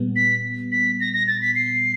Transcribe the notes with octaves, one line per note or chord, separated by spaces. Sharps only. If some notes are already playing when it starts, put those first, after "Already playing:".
Already playing: A#2 G3 B3
B6
B6
A#6
A#6
A6
B6
C7